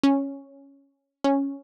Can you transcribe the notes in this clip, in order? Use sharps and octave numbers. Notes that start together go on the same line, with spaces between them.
C#4
C#4